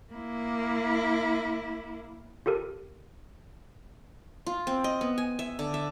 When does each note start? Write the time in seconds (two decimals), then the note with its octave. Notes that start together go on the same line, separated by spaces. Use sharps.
0.13 A#3 E4
2.46 F4 G4 A4 A#4
4.46 F4
4.67 C4
4.84 D#5
5.01 B3
5.18 G#5
5.39 E5
5.59 D3
5.74 E5